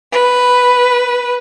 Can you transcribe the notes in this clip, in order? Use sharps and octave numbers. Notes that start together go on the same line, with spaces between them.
B4